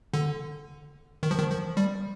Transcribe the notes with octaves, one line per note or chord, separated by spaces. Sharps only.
D3
D#3
F3
D#3
F3
G3